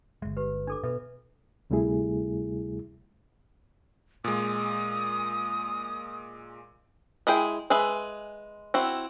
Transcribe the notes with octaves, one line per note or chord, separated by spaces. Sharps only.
G1 G#3 E5
G4 B4
D4 A4 D6
B2 A4 B4 E5
D2 C3 G3 A3 E4 G#4
A#2 G#3 D#6
G#3 E4 G#4 G5
G#3 G#4 B4 E5
C4 E4 F#4